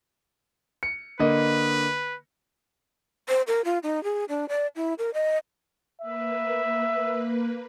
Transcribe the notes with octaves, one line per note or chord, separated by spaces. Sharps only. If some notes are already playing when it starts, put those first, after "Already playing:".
C#7
D3 A#3 B4 D#5
C5
A#4
F4
D#4
G#4
D4
D5
E4
A#4
D#5
A#3 B4 E5